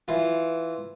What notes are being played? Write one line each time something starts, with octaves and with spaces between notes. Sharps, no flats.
E3 F4